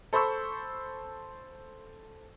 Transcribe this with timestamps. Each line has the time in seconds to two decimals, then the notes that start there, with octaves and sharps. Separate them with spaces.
0.13 A4 C5 B5 C#6 E6